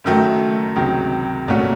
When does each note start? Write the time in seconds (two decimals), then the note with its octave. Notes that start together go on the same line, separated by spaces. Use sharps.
0.04 F#1 F#2 D#3 F#3 A3
0.76 C#2 C3 D#3 F#3
1.48 C2 A#2 A3 C#4 F#4